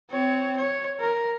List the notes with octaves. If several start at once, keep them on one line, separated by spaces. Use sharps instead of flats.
C4 C#5
C#5
A#4